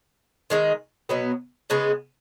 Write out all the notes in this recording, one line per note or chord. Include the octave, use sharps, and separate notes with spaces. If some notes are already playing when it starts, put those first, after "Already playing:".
D#3 G#3 D#4
B2 F#3 B3
C#3 G#3 B3